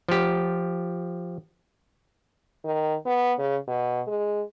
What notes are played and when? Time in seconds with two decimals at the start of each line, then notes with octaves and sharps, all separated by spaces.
0.09 F3 G4
2.65 D#3
3.06 B3
3.38 C#3
3.68 B2
4.07 G#3